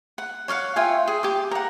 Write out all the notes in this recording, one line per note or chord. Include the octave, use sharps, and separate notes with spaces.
F#5
C#5 D5 F5 F#5
F4 E5 G5 G#5
G#4
G4 D6
A#4 F#5